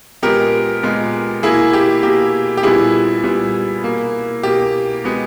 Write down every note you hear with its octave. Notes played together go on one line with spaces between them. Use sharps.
A#2 G#3 B3 G4 A#4
A#2 G#3 B3
B2 A#3 E4 G#4
G4
B2 A#3 G4
G4
A#2 G3 B3 E4 G#4
A#2 G3 B3
B2 A#3
B2 A#3 G4
B2 G#3 B3